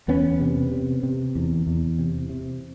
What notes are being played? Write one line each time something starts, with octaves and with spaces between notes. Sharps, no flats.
E2 B3 C#4
C3
C3
C3
E2
E2
C3
C3